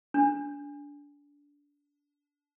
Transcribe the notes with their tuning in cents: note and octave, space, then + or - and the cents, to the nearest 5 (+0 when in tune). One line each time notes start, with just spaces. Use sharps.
D4 -25